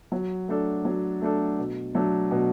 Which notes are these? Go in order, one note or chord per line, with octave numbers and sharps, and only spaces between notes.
F#3
A3 D4 A4
F#3
A3 D4 A4
B2
F#3 A3 D4 A4
B2